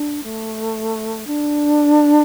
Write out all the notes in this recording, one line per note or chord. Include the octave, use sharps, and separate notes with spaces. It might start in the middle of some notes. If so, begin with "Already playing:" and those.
Already playing: D4
A3
D4